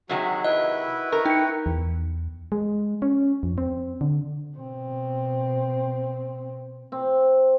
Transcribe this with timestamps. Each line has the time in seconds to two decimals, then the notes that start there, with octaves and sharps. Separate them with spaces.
0.09 C3 D#3 F#3 G#3 F#4
0.44 E4 B4 D#5
1.12 A#4 C#6
1.25 D#4 G5 C#7
1.66 E2
2.52 G#3
3.02 C#4
3.43 F2
3.58 C4
4.01 D3
4.57 B2 C4
6.92 C4